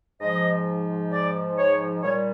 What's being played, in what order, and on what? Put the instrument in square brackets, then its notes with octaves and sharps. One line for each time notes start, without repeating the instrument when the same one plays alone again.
[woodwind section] G#2 F3 D#5
D5
C#5
A#2 G3 C#5